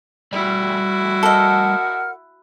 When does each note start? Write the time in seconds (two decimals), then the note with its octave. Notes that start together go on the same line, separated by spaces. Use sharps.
0.33 G3 A3 E4 F#4 D5
1.23 A4 A#4 D#5 F#5 F6